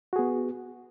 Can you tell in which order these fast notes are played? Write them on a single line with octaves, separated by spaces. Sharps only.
F#4 G#4 B3